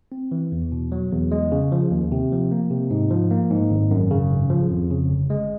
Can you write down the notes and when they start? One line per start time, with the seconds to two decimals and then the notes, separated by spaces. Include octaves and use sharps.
0.12 C4
0.32 E3
0.52 E2
0.72 B2
0.92 F#3
1.12 E2
1.31 G#3
1.52 C#3
1.72 F3
1.91 D#2
2.12 C3
2.32 F3
2.51 A#3
2.71 C3
2.91 G#2
3.11 F3
3.31 A#3
3.50 G#2
3.70 G#1
3.91 F#2
4.11 C#3
4.31 G#1
4.50 F3
4.70 F2
4.91 C#3
5.10 G1
5.30 G#3